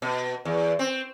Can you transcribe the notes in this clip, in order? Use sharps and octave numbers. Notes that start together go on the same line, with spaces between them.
B2
E2
C4